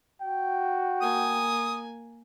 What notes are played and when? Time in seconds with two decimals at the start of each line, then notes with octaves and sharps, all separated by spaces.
0.21 F#4 G5
1.01 A#3 G#5 D#6